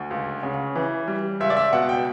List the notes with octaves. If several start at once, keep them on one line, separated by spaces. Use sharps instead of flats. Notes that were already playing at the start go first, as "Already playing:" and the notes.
Already playing: D2
C#2
C#3
E3
G3
C#2 E5
D5
E5
B2 F#5
G5